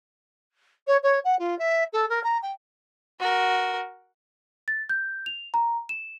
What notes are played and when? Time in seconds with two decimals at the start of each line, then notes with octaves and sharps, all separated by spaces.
0.87 C#5
1.02 C#5
1.24 F#5
1.39 F4
1.58 E5
1.92 A4
2.09 A#4
2.23 A#5
2.42 G5
3.19 F#4 A#4
4.68 A6
4.89 G6
5.26 F7
5.54 A#5
5.89 E7